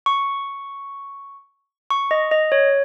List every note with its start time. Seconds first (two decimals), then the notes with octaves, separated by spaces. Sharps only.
0.06 C#6
1.90 C#6
2.11 D#5
2.31 D#5
2.52 C#5